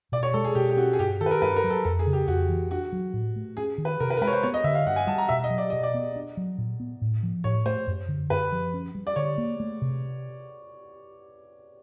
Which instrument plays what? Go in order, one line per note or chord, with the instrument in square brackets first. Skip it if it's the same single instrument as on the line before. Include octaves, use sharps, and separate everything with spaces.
[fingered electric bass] B2 [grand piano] D5
[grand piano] C#5
[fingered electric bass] G#3 [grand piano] A4
[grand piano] G#4
[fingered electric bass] B2 [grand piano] G4
[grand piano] G4
[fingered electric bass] C#4 [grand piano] F#4
[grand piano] G#4
[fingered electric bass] G2 [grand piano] G4
[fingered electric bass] D#3 [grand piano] A4
[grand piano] B4
A#4
[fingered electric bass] G2 [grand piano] B4
[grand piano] A#4
[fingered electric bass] F#3
[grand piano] A4
[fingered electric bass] F2 [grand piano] A4
[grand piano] G#4
[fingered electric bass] C#3
[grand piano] G4
[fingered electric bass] F2 [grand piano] F#4
[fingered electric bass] E3
[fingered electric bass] D4 [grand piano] F#4
[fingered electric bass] F#3
A2
A3
[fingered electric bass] C#4 [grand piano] G#4
[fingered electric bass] D#3
[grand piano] B4
[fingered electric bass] C3 [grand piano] A#4
[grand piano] B4
A#4
[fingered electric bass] G#3 [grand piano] B4
[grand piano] C#5
C5
[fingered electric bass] B3 [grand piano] C#5
[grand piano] D#5
[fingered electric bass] D3 [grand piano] E5
[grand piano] F5
[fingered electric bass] G2 [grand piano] F#5
[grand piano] G#5
[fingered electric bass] G3 [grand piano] A5
[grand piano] A#5
[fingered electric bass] B2 [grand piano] E5
[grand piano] D#5
[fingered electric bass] F#3
[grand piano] D5
[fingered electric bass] B2 [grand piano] D#5
[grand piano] D5
[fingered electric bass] B3
D4
F#3
A#2
B3
A2
F3
[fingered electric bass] A2 [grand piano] C#5
[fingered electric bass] A3 [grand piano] C5
[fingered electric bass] F#2
D3
[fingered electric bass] F#2 [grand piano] B4
[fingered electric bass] F3
C#4
G3
[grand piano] D5
[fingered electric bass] D3 [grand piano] C#5
[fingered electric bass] A#3
A3
C3